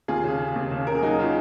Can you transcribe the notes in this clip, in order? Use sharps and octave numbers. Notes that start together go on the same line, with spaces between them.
D#2 F4 G#4
C#3
C#3
D#2
C#3
C#3 A#4
G#4
F#3 D#4 F#4
C#3 F4